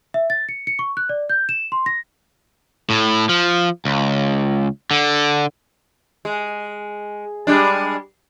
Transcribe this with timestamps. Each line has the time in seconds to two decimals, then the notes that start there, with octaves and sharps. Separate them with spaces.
0.14 E5
0.30 A6
0.49 C#7
0.67 C#7
0.79 C#6
0.97 F#6
1.09 D5
1.30 G6
1.49 E7
1.72 C6
1.86 A#6
2.90 A2
3.29 F3
3.85 C#2
4.91 D3
6.25 G#3
7.47 G3 G#3 D4